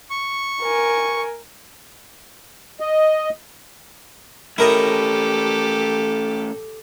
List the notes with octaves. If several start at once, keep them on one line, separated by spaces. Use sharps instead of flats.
C#6
A#4 G#5
D#5
A3 C#4 E4 G4 A4 A#4 D#5